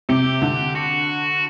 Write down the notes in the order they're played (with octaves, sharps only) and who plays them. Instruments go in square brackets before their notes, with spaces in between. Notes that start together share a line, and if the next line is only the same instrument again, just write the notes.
[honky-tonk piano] C3 [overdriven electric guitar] G4
[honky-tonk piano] D3
[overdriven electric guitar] F#4